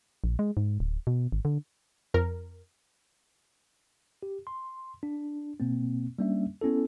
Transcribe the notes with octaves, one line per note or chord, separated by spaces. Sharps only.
A#1
G#3
G#2
D1
B2
G#1
D3
F2 A#4
G4
C6
D4
B2 A#3 C4
G3 A#3 C#4 D4 E5
B3 C#4 E4 A4